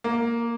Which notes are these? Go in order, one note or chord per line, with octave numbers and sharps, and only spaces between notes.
A#3